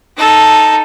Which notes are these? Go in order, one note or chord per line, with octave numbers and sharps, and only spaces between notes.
D#4 A4